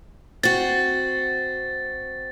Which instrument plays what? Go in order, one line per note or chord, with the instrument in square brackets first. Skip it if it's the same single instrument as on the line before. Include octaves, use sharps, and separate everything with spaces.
[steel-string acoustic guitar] C4 F#4 [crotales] A6